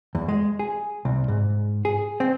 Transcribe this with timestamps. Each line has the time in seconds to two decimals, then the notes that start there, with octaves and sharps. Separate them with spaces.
0.15 E2
0.28 G#3
0.59 G#4
1.05 C2
1.28 G#2
1.85 G#4
2.20 C4